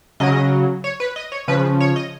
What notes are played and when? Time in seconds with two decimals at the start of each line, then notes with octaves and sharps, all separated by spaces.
0.20 C#3 F#3 D#5
0.84 C#5
1.00 B4
1.16 D#5
1.32 C#5
1.48 C#3 F3 B4
1.80 C#5
1.96 D#5